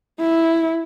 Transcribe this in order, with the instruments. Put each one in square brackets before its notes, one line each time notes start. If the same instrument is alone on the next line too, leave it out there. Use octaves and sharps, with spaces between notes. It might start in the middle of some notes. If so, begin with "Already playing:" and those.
[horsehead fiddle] E4